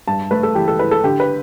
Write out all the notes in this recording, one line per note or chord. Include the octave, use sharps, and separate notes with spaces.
G2 A5
A3 B4
A4
E3 G4
A4
E4 B4
A4
D3 G4
B4